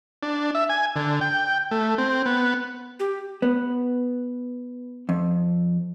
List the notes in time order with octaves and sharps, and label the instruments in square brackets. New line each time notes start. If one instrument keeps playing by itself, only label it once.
[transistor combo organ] D4
E5
G#5
D3
G5
A3
C4
B3
[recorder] G4
[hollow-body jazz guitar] B3
F2